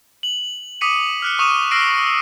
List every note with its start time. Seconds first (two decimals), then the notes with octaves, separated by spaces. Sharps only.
0.23 F#7
0.81 D6 D#6 B6 C#7 D#7
1.22 F6 F#6 C#7
1.39 C#6 D#6 D#7 E7
1.71 E6 F6 A#6 C7 D7